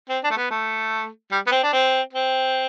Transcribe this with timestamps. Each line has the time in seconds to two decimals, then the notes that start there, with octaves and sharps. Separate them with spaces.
0.09 C4
0.24 D4
0.31 A3
0.37 B3
0.51 A3
1.32 G3
1.47 B3
1.52 C4
1.63 D4
1.73 C4
2.13 C4